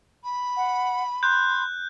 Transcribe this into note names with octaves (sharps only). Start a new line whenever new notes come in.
B5
F#5
C6 F#6 G6